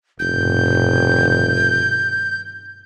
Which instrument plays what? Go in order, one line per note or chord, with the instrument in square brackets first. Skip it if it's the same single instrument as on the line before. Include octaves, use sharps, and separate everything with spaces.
[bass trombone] F1 [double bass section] G2 B2 D#3 [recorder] G6